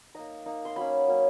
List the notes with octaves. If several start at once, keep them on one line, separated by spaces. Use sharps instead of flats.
A#3 D#4 A#5
A#3 D#4
C6
F#3 A#3 C#4 B5
F#3 A#3 C#4